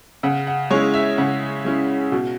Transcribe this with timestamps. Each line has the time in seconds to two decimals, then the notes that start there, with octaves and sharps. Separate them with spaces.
0.23 C#3 F#5
0.47 F#5
0.70 G#3 C#4 E4 C#5
0.94 E5
1.18 C#3 F#5
1.64 G#3 C#4 E4
2.12 B2